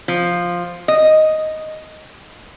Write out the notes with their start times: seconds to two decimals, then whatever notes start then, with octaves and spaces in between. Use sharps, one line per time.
0.08 F3
0.88 D#5